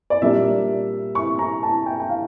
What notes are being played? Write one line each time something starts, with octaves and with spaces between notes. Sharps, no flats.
D5
A#2 G3 A#3 D4 E5
C#6
A#5
A5
G5
G5
F5